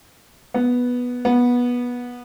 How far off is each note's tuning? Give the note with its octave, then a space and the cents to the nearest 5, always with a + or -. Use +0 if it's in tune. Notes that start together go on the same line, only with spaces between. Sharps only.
B3 -5
B3 -15